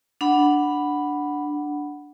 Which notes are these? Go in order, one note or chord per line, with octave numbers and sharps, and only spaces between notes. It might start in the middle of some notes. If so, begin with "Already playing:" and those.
D4 F#5 B5